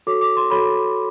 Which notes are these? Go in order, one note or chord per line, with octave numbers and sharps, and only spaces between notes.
F#4 A4 C#5 D6
D6
C6
F#4 A4 C#5 B5